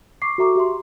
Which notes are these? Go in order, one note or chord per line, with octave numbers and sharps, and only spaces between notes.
C#6 D6 C7
F#4 A4 E5 A#5 C#6 D6
G4 E5 C6